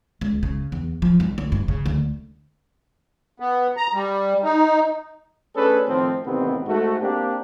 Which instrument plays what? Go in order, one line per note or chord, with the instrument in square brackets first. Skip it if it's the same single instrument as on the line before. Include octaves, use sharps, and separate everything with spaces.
[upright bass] C#2
C#3
E2
F3
C2
D2
G2
C#3
D2
[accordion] B3
A#5
G3
D#4
[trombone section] A3 C#4 D4 G#4 A4 B4
A2 D#3 F3 C4
A1 C3 D#3 B3 C4
G#2 A3 F#4
A#3 C4 D4 G4